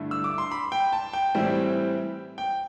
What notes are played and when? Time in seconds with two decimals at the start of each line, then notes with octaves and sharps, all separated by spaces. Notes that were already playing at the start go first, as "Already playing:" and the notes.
Already playing: G2 D3 A3 E4
0.11 E6
0.24 D6
0.38 C6
0.51 B5
0.72 G5
0.93 A5
1.13 G5
1.35 A2 E3 G3 C4 E4
2.38 G5